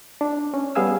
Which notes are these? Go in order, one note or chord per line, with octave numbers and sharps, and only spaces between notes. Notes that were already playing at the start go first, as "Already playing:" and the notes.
D4
C#4
G3 B3 G#4 F5 G#5 E6